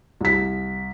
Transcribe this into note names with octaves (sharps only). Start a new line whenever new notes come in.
C2 B6